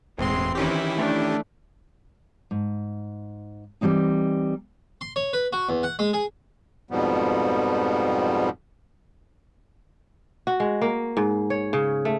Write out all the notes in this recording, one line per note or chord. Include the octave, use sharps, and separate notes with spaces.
E1 E2 A2 G#3 C4 C6
D#3 E3 C#4 E4 G4
A3 D4
G#2
E3 G3 G#3 C4 D#4
C6
C#5
B4
F#4
E2
F#5
G#3
G#4
F2 G#2 B2 F3 G3 B3
F#4
G#3
A#3
G#2
C#5
C#3
A3